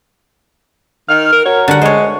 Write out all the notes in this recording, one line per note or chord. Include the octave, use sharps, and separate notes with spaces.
D#3 F6
A#4
F#4 A#4 C#5
D3 G3 F#5
G#3 C5 C#5
D2